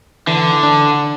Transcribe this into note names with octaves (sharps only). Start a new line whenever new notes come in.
D3 E3
D4